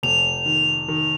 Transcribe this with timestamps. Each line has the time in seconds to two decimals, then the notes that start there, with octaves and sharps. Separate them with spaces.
0.03 F1 F7
0.46 D#3
0.88 D#3